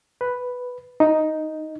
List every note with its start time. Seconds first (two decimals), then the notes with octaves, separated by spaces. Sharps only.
0.21 B4
1.00 D#4